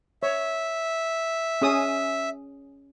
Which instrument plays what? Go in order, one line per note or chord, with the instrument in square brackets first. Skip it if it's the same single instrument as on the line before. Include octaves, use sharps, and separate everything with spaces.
[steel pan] C#5 [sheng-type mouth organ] E5
[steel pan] C#4 G#4 D#6